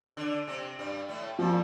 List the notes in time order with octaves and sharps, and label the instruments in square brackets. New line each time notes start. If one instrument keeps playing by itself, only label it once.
[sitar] D3 D4
C3 C4
G2 G3
A2 A3
[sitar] A#2 A#3 [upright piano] F3